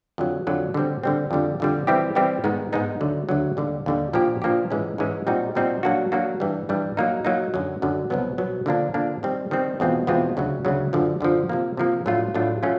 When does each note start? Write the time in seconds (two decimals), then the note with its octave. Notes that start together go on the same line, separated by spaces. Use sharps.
0.18 F2 D3 F#3
0.47 F2 D3 F#3
0.74 D3 G3 C4
1.03 D3 G3 C4
1.31 F2 D3 G3
1.60 F2 D3 G3
1.87 E3 G3 C4 E4 G4
2.15 E3 G3 C4 E4 G4
2.44 G#2 D#3 G#3 B3 D#4
2.73 G#2 D#3 G#3 B3 D#4
3.01 D2 D3 F#3
3.29 D2 D3 F#3
3.57 D#2 D3 G3
3.86 D#2 D3 G3
4.13 A#2 F3 A#3 D4 G4
4.42 A#2 F3 A#3 D4 G4
4.71 G#2 E3 G#3 C#4
4.98 G#2 E3 G#3 C#4
5.27 A#2 G3 C4 D#4 F#4
5.55 A#2 G3 C4 D#4 F#4
5.83 F#3 A#3 D4 F#4
6.12 F#3 A#3 D4 F#4
6.40 G2 E3 G3
6.69 G2 E3 G3
6.97 F#3 A#3 D#4
7.25 F#3 A#3 D#4
7.54 F#2 D3 F#3
7.82 F#2 D3 F#3
8.10 C2 B2 F#3 B3
8.38 C2 B2 F#3 B3
8.66 D3 F3 A#3 D4
8.94 D3 F3 A#3 D4
9.23 D#3 G3 C4
9.51 D#3 G3 C4
9.80 E2 B2 G#3 C4 F4
10.07 E2 B2 G#3 C4 F4
10.37 D2 C#3 F#3
10.65 D2 C#3 F#3
10.93 F#2 D3 F3
11.21 F#2 D3 F3
11.49 C3 F3 A#3
11.77 C3 F3 A#3
12.06 A2 F#3 A3 D4 F4
12.34 A2 F#3 A3 D4 F4
12.63 F#3 A3 C#4 F4